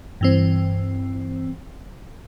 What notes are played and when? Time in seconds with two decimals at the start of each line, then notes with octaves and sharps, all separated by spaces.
0.21 G2 E3 C4